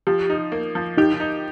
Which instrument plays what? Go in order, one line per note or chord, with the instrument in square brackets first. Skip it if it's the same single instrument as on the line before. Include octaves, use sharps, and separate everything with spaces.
[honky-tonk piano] F3 [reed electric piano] G4
[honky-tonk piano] D#4
A#3
F3
[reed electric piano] D#4 [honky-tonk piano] G4
[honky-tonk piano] D#4